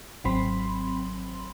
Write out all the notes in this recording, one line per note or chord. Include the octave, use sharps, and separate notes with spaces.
G#1 F#3 C4 B5 C6